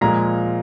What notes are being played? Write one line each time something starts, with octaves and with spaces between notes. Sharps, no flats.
A#2 F3 G#3 A#5